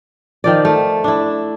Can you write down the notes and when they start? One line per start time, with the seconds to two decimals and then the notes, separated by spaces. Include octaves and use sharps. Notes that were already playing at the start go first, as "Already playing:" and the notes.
0.44 D#3 F3 D5
0.65 A3
1.04 D4 E4